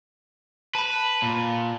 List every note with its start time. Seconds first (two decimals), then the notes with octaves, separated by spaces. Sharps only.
0.75 B4 A5 B5
1.22 A#2